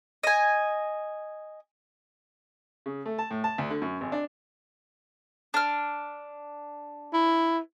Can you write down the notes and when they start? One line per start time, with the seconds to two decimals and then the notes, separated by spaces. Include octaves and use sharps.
0.24 D#5 G#5
2.86 C#3
3.06 A3
3.18 A5
3.31 A2
3.44 A5
3.58 D2
3.70 D3
3.82 F#2
4.01 G#1
4.12 D4
5.54 D4 F6
7.13 E4